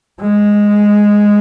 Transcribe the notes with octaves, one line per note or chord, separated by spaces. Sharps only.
G#3